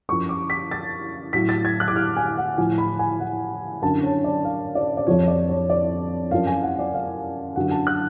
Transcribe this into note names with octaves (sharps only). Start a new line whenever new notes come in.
F#2 F3 C#6
D6
B6
A6
A2 F#3 B6
A6
G#6
F#6
D6
F6
G#5
F#5
A2 F3 G#5
B5
G#5
F#5
F#2 D3 F#3 A5
C#5
D5
F5
D5
D5
F2 F3 C#5
D5
C#5
D5
F#2 F3 F5
G#5
F#5
D5
F5
F#2 D3 F#3 F#5
A5
F#6